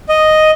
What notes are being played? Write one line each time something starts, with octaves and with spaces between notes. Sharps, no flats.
D#5